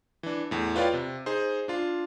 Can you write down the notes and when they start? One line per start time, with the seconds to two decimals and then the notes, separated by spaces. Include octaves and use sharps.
0.23 E3 D4
0.51 E2 A2
0.76 F4 B4 C#5 D5 F5 G5
0.93 C3
1.26 D#4 G#4 C5
1.68 D4 F4 C6